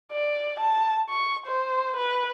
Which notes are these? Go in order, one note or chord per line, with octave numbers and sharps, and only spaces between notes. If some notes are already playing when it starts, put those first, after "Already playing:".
D5
A5
C#6
C5
B4